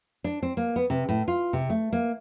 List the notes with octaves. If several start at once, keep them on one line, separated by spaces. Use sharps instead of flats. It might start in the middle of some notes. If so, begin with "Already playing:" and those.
D4
C4
A#3
B3
C3
A2
F4
C3
A3
A#3